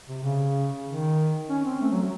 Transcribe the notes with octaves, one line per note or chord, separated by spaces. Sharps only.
C3
C#3
D#3
C#4
C4
A3
F#3
F#3